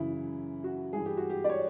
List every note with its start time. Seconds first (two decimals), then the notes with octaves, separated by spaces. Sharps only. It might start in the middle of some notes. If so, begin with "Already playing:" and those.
Already playing: F#2 C#3 E3 E4
0.64 F#4
0.93 G2 E3 G#4
1.06 G4
1.17 F#4
1.30 G4
1.44 D5
1.49 C#5